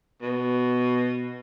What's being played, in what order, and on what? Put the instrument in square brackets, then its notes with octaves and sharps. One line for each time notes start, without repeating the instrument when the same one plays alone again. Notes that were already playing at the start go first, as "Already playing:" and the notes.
[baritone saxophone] B2